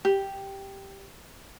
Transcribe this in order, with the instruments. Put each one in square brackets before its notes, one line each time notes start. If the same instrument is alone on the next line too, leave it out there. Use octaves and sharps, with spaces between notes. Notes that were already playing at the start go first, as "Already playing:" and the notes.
[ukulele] G4